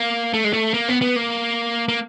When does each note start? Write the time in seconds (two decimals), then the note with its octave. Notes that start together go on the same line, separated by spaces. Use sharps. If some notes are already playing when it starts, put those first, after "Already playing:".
Already playing: A#3
0.34 A3
0.44 G#3
0.53 A3
0.74 A#3
0.88 B3
1.02 B3
1.16 A#3
1.89 A#3